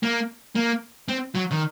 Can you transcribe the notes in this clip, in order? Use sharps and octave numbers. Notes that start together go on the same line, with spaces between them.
A#3
A#3
C4
F#3
D#3